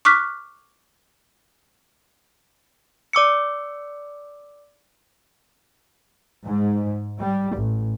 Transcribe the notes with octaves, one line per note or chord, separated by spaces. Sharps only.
C#6 D6 F6 F#6 B6
D5 D6 E6 C#7
G#2
G3
A1